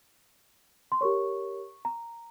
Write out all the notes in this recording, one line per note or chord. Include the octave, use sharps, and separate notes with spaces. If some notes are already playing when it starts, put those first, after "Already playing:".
C6
G4 A#4 C#5 C#6
A#5